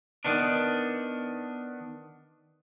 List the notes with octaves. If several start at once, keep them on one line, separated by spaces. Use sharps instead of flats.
D#3 B3 D4